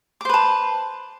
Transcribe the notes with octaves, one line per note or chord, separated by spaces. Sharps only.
B4 C5 A5 D6